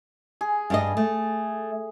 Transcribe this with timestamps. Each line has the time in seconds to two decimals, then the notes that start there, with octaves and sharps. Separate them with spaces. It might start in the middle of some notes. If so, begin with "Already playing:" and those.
0.41 G#4
0.70 G2 D4 D#5
0.97 A3